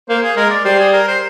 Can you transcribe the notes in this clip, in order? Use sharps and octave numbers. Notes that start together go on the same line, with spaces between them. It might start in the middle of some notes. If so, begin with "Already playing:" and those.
A#3 C5
G#4
G#3 A#4
D5
G3 C5
G#4
A#4
C5